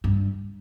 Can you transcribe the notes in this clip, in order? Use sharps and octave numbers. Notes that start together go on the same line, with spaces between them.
G2